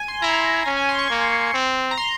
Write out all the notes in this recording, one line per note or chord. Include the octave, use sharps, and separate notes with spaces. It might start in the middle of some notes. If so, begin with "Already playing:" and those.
Already playing: G#5
C6
E4 A#5
C#4 G#5
G#5
C6
C#6
A#3
C4
A#5
C6